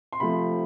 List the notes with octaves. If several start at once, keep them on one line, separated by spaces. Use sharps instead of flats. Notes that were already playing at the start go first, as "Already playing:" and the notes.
C6
C3 F3 A3 B5